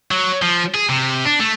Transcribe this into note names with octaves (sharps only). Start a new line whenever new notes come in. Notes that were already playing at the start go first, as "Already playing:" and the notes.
F#3
F3
G#4
C3
D4
A3